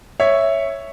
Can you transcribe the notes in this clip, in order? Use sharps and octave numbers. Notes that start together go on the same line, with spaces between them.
C#5 E5